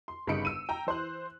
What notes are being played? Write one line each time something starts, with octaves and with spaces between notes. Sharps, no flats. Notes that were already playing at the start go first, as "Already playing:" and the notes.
C6
G1 C#3 D#4 B5 C#7 D7
E6 D#7
G5 A#5
E3 C5 C6 F#6